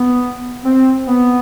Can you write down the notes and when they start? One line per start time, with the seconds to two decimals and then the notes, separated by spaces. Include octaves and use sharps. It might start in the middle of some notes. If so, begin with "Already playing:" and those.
Already playing: B3
0.62 C4
1.07 B3